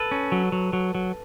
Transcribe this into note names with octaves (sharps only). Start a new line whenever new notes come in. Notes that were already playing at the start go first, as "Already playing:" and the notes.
Already playing: A4 B4
C#4
F#3
F#3
F#3
F#3